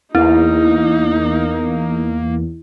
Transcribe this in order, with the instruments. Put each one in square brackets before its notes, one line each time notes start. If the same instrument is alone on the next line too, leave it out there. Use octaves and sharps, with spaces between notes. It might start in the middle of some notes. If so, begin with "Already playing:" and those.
[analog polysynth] E2 [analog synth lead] A#3 [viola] D#4 [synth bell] E4